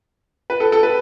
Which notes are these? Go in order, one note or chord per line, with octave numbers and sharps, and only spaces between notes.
B4
A4
A4
B4